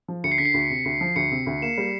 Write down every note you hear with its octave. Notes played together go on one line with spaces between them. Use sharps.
F3
D2 C#7
C7
D3 B6
C7
D2
C3
D2
F3
D2 C#7
C3
D2
A#3 E7
G3